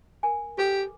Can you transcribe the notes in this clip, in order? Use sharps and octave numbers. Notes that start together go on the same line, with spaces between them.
A#4 G#5
G4 A4 B4 D6